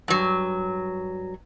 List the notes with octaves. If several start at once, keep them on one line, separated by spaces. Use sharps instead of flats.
G2 F#3